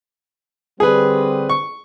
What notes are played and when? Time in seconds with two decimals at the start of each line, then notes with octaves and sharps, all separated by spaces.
0.80 D3 G3 C4 G#4 B4
1.49 C#6